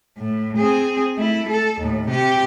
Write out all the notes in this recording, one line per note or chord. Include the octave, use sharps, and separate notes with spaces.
A2
C4 G#4
A3 E4
A4
D#2 A2
C3 G4